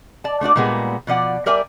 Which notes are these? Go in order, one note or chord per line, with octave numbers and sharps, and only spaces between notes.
D5 A5
A3 D4 F#4 D5
A#2 G3 G#3 A#3 B3
B2 F3 D5 F#5
G3 A#4 D5 E5 G#5